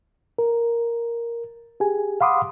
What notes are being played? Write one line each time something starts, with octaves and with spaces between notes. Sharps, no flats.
A#4
G4 G#4 G#5
F5 F#5 B5 C6 D6 D#6